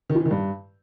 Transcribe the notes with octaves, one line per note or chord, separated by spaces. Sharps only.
D#3
F3
E3
D#3
G2